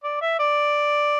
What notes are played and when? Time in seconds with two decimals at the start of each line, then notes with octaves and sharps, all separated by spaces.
0.04 D5
0.21 E5
0.39 D5